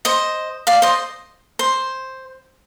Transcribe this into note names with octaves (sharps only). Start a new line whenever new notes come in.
C5 D#5
D5 F5
C5 D#5
C5